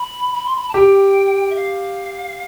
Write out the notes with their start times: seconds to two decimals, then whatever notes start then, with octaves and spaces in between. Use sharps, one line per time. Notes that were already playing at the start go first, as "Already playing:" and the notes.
Already playing: B5
0.33 B5
0.45 C6
0.55 B5
0.69 A5
0.74 G4 G5
1.50 E5
1.55 F5